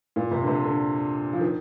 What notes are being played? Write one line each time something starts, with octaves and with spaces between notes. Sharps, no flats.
A#2
C3
D3
C3
D3
F3
D#3